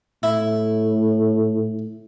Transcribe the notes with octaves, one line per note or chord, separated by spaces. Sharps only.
A2 E4